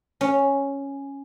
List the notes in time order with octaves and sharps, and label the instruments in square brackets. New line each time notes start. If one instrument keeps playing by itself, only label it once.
[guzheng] C#4